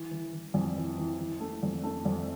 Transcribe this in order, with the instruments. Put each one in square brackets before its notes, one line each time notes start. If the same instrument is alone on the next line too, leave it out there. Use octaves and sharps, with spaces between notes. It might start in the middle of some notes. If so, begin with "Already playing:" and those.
Already playing: [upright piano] E3
E3
E3
F2
E3
E3
E3
A3
F2
A3
F2